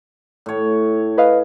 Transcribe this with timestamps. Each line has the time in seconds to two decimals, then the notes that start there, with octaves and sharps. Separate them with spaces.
0.46 A2 C#5
1.17 B4 D#5 F5